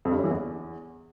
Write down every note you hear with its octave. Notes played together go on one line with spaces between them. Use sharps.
F2
G2
F#2
E3
E2